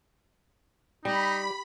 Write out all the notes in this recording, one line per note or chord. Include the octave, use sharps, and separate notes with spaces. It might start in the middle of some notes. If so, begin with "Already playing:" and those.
G3 D#4 G4 B5